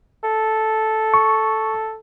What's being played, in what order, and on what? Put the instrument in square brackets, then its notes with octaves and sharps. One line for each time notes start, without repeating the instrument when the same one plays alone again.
[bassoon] A4
[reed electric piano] C#6